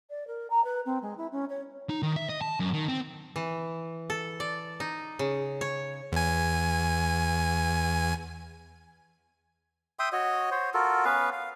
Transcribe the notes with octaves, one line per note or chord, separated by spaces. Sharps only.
D5
A#4
A#5
B4
C4
G#3
E4
C#4
C#5
D#4
D#3
E5
D#5
A5
F#2
D#3
C4
E3
A4
D5
D#4
C#3
C#5
E2 G#5
E5 G5 C6 D#6
F#4 C#5 D#5
C5 C#5
F4 F#4 A4 A#4
B3 C#4 B4 F5
F5